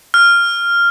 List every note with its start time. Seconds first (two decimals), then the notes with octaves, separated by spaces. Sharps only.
0.14 F6